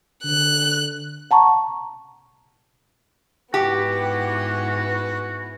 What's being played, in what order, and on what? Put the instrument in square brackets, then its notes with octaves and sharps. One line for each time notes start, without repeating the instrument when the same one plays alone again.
[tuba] D3 [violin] F#6
[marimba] F#5 A5 A#5 C#6
[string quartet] G#2 E3 B3 [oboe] F#4 [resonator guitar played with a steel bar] G4